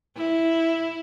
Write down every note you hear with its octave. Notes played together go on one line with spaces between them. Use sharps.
E4